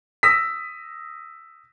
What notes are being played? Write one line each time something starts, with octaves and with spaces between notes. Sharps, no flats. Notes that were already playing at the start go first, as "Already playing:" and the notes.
D#6 E6 A#6 B6